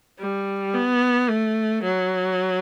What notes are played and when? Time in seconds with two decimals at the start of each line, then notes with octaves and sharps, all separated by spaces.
0.19 G3
0.74 B3
1.29 A3
1.83 F#3